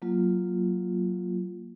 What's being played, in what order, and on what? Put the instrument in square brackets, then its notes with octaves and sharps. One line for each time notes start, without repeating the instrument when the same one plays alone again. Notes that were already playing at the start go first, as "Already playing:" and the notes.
[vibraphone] F#3 A#3 F4